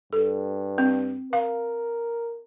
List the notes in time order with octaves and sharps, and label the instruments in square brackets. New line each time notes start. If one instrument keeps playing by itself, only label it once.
[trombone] G2 [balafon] A4
[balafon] C4
[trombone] A#4 [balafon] F5